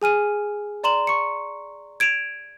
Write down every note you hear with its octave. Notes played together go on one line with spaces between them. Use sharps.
G#4 G#5 F6 D#7
D5 A#5 C6 E7 F#7
C#6 C#7
G#6 D7 E7 F7